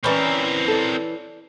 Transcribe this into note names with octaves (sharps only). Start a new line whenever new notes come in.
E3 C4 C#4 A#4 D5 B5
A4 D5